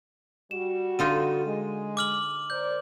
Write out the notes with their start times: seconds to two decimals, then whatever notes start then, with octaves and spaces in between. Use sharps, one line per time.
0.51 G3 F#4 E7
0.99 D3 D#4 F4 D#7
1.45 G#3
1.97 D6 F6 F#7
2.50 A#4 C5 D5 G6